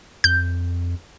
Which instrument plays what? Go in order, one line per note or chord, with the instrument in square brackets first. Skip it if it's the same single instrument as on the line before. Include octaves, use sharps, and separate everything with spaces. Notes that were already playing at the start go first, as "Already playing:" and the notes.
[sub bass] F2 [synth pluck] G6